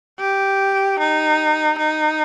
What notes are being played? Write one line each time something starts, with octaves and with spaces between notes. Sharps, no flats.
G4
D#4
D#4